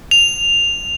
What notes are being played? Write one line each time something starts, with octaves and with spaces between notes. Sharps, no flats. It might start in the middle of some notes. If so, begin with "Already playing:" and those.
F7